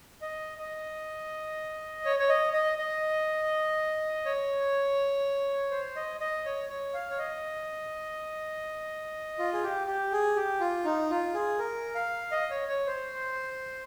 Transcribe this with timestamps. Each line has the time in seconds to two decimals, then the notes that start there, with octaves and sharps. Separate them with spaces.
0.22 D#5
0.58 D#5
2.05 C#5
2.19 C#5
2.29 D#5
2.53 D#5
2.78 D#5
4.26 C#5
5.71 C5
5.96 D#5
6.21 D#5
6.45 C#5
6.69 C#5
6.94 F5
7.10 C#5
7.19 D#5
9.39 F4
9.53 G#4
9.63 G4
9.87 G4
10.12 G#4
10.36 G4
10.60 F4
10.85 D#4
11.10 F4
11.34 G#4
11.59 A#4
11.95 F5
12.32 D#5
12.50 C#5
12.68 C#5
12.87 C5